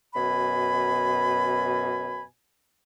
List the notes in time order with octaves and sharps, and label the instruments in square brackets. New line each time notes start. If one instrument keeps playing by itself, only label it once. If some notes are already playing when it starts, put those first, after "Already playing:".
[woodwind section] F#2 B2 G#5 B5